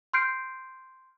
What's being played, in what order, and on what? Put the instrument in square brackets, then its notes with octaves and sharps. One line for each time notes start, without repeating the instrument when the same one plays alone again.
[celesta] C6 F6 G6 C7 D7